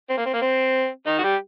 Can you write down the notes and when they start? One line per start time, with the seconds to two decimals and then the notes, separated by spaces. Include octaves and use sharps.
0.10 C4
0.17 A#3
0.26 C4
0.34 A#3
0.42 C4
1.07 D#3 D#4
1.19 F#4
1.23 G3 G4